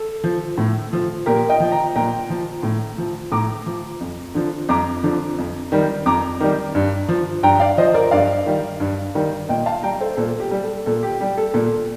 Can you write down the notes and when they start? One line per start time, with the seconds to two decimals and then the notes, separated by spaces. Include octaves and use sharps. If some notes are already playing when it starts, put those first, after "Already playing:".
Already playing: A4
0.24 F3
0.58 A2
0.93 F3
1.26 A#2 G4 A#4
1.49 D#5 G5
1.60 F3
1.72 G5 A#5
1.96 A#2 G5 A#5
2.30 F3
2.63 A2
2.98 F3
3.32 A2 A#5 D6
3.66 F3
4.00 F2
4.34 D3 F3
4.69 F2 A#5 D6
5.03 D3 F3
5.38 F2
5.72 D#3 G3
6.06 F2 A#5 D6
6.40 D#3 G3
6.75 G2
7.08 F3
7.43 G2 G5 A#5
7.60 D5 F5
7.78 F3 C5 D#5
7.94 A#4 D5
8.11 G2 D5 F5
8.46 D#3 G3
8.80 G2
9.15 D#3 G3
9.49 A#2 D#5 G5
9.66 F5 A5
9.83 G3 G5 A#5
10.01 A4 C5
10.17 A#2 A4
10.40 G4
10.51 G3
10.63 A4
10.86 A#2 A4
11.03 G4
11.20 G3 G4
11.38 A4
11.54 A#2 A4